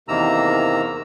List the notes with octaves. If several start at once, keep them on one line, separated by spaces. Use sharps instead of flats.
E2 C3 D#3 A#3 A#5 E6